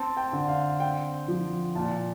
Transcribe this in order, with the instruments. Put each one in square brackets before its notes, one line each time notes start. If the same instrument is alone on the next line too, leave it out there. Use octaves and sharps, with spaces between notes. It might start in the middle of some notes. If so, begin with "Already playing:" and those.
Already playing: [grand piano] C4 A5
G5
D3
F5
C4 G5
F3
A#2 A5